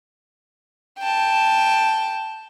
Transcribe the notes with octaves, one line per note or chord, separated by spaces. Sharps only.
G5 A5